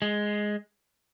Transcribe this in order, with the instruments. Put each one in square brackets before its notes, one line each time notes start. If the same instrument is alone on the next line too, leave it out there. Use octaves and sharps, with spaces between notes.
[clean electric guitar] G#3